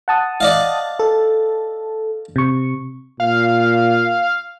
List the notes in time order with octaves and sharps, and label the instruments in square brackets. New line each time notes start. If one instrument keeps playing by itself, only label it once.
[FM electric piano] F#5 A5 D#6
[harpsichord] D5 D#5 F5
[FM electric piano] A4
C3 C#6
[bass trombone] A#2 [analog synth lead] F5